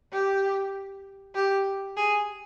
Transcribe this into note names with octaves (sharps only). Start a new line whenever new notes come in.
G4
G4
G#4